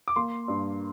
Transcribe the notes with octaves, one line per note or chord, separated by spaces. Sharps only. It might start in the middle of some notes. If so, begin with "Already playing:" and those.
D6
A#3 C6
G2